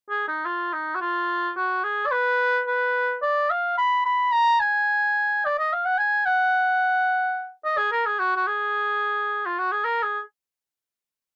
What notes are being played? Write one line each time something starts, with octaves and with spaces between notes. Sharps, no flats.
G#4
D#4
F4
D#4
F#4
F4
F#4
G#4
D5
B4
B4
D5
F5
B5
B5
A#5
G#5
D5
D#5
F5
F#5
G#5
F#5
D#5
G#4
A#4
G#4
F#4
F#4
G#4
F4
F#4
G#4
A#4
G#4